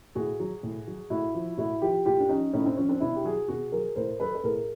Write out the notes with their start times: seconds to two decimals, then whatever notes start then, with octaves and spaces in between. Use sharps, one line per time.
0.15 A2 F#4 G#4
0.40 F#3
0.63 A2
0.87 F#3
1.10 A2 E4 F#4
1.35 F3
1.58 A2 E4 F#4
1.82 F3 F4 G4
2.05 A2 F4 G4
2.20 D4
2.29 F3 C#4 D#4
2.53 A2 C#4 D#4
2.65 C4 D4
2.77 F3 C#4
2.89 C4 D4
3.00 B2 D4 E4
3.16 G4
3.24 F#3 F#4 G#4
3.48 B2 F#4 G#4
3.72 F#3 G#4 A#4
3.96 A2 A#4 C5
4.20 F#3 A4 B4
4.35 B4
4.44 A2 G#4 A#4